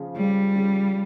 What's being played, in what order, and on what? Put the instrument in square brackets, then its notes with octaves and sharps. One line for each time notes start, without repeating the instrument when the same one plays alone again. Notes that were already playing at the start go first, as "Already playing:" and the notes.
Already playing: [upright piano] C#3 F3
[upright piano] C#3 [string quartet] G3
[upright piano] C#3